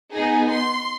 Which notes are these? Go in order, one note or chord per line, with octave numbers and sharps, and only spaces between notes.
B3 D#4 G#4
C6